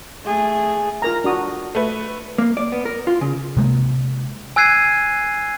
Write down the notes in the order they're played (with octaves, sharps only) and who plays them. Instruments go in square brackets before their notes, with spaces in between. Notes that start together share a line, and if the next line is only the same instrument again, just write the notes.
[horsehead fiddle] A3 G#4
[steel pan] F4 A#4 A#5
D4 F#4 D#6
[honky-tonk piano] A3 B4
[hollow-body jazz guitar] A#3
D5
B3
A#4
F4
C#3
[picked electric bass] C3 G#3 A#3
[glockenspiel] G#5 E6 F#6 G#6 C7 D#7